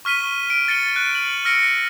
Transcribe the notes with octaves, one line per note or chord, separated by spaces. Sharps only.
C#6 F6 B6 D#7 G7
D7
A6 C#7 D#7 G7
F#6
D#7 F#7
E6 F6 A#6 C#7 D7